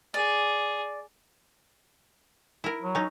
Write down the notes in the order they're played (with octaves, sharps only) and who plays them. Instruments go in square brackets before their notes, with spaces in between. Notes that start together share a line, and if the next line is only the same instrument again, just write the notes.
[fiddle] G#4 [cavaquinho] D5
[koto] E4 A#4
[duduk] F#3
[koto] C#4 D#4